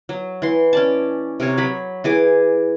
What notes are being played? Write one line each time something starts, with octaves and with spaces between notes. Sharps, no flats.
F#3
E3 C6
C#4 D5 A5
C3 A#4 C#5
F#3 B5
E3 G#4 D6